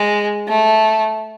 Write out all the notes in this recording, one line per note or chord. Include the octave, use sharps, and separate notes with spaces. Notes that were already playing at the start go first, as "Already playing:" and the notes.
Already playing: G#3
A3